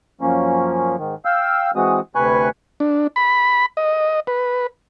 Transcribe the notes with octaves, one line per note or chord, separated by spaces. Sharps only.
F#2 F3 A#3 C#4
G#2 D#3
F5 G5 E6
E3 G#3 C4 F#4 D#6
D2 C3 B4 G#5 C#6 F#6
D4
B5
D#5
B4